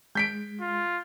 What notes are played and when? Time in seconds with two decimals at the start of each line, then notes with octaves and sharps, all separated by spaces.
0.15 G#3 G6 B6 D7
0.61 F4